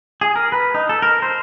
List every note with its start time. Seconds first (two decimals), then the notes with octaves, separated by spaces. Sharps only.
0.21 G#4
0.36 A#4
0.52 B4
0.75 D#4
0.89 A4
1.02 A#4
1.22 C5